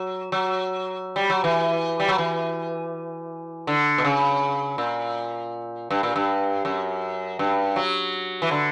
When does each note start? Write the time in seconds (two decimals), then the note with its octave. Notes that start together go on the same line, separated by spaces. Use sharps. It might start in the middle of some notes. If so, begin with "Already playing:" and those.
Already playing: F#3
0.32 F#3
1.16 G3
1.30 F#3
1.44 E3
2.00 G3
2.09 F#3
2.18 E3
3.67 D3
3.98 B2
4.05 C#3
4.78 A#2
5.91 G2
6.03 A#2
6.16 G2
6.65 F#2
7.39 G2
7.76 F#3
8.42 E3
8.51 D3